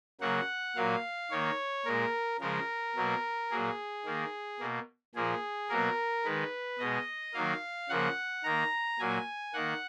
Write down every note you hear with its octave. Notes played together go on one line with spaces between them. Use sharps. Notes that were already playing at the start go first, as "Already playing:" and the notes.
C#3 F#3 A#3 F#5
A#2 F#3 A#3 F5
D#3 A#3 C#5
A#2 G#3 A#4
C#3 F3 G#3 A#4
B2 F#3 A#3
A#2 F#3 A#3 G#4
D#3 A#3
B2 A#3
A#2 F3 A#3 G#4
B2 F#3 A#3 A#4
D#3 G#3 B4
B2 G#3 D#5
D#3 F#3 A#3 F5
C#3 F3 A#3 F#5
D#3 A#3 A#5
A#2 F#3 A#3 G#5
D#3 A#3 F#5